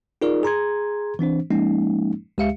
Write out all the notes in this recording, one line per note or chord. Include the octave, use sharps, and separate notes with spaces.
D#4 F4 G#4 A#4 D5
G#4 A#5 C6 G#6
E3 C4 D4 C5
F3 G#3 A#3 C#4 D#4
C#2 G#3 G4 E5 F5 C#7